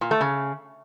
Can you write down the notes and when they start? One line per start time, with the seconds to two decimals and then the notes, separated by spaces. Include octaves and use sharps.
0.01 A#2
0.11 A3
0.21 C#3